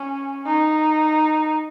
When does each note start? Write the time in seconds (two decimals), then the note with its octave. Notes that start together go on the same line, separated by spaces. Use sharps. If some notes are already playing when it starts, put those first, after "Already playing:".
Already playing: C#4
0.46 D#4